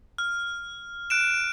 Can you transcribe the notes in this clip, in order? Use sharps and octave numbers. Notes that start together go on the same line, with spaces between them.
F6
F#6 D7 E7